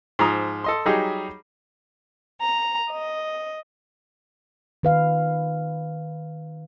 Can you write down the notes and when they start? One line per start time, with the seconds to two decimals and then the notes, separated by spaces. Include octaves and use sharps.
0.19 G#2 F3 A#5 D#6
0.64 A4 D#5 C6
0.86 F#3 G3 D#4 G4 G#4
2.40 A#5
2.90 D#5
4.83 D#3 B4 F5